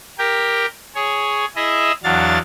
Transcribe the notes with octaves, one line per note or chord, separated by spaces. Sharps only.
G4 A#4 G5
G#4 C#5
E4 G#4 D#5 E5
E2 F#3 D4 F5 A6